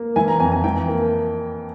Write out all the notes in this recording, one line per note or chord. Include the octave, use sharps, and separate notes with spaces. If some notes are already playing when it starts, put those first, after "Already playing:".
Already playing: A#3
E3 G#5
A#5
F2 G#5
G#5
E3 G5
A#3